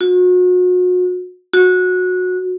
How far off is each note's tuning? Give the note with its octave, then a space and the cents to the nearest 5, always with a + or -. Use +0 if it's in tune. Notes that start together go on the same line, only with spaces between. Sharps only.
F#4 -35
F#4 -20